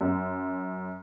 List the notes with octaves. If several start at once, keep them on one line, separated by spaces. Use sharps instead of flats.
F#2